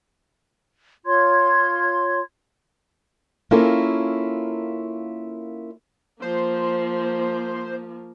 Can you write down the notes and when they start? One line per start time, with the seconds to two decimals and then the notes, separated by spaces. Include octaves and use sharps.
1.05 F4 C#5 C6 G#6
3.51 A#3 C#4 E4 F4 A4 A#4
6.22 F3 A#3 C5